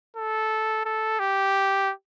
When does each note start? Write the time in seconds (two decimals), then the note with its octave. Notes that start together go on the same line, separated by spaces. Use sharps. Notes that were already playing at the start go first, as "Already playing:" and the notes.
0.16 A4
0.85 A4
1.19 G4